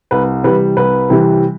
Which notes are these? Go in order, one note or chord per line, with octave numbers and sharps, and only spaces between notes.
C2 B4
C3 E3 G3 B4
C2 B4
C3 E3 G3